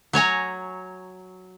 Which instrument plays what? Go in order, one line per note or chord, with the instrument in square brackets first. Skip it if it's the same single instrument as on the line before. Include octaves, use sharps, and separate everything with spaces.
[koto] F#3 C#5 G#5 A#5